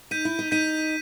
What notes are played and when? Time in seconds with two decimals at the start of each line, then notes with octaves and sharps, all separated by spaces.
0.11 D#4 G6 B6 D#7
0.25 E4
0.39 D#4
0.51 D#4 G6 B6 D#7